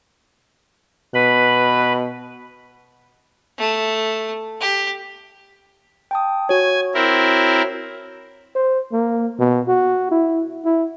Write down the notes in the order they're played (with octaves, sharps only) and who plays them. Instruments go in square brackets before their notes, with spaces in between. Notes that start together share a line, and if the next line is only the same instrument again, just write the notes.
[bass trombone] B2 [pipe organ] B4 B5
[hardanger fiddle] A3
G4
[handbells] G5 A5 D#6
[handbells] F#4 C#5 [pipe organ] G#5
[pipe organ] C4 E4 A#4
[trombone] C5
A#3
B2
F#4
E4
E4